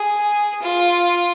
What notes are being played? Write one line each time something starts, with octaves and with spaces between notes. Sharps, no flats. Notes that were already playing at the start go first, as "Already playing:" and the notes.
Already playing: G#4
F4